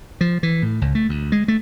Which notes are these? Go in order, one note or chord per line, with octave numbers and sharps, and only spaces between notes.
F3
E3
A2
C#2
A3
D2
G#3
A3